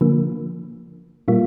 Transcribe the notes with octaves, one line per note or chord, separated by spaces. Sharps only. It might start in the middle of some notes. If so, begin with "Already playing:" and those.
D3 F3 A#3
A#2 G3 A#3 F4